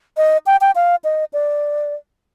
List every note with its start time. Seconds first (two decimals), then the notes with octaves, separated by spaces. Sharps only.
0.17 D#5
0.46 G5
0.61 G5
0.75 F5
1.04 D#5
1.33 D5